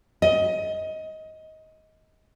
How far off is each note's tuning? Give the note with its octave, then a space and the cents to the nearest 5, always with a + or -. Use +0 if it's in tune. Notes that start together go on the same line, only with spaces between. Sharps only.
D#5 +20